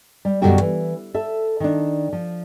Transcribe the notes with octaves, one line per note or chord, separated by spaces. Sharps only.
G3
F#2 B2 D3 G3 F#4 G5
E3
A4 E5
D#3 D4
F3